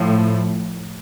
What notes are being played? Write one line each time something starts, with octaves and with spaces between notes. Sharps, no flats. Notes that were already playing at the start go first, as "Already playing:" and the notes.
Already playing: A2 F3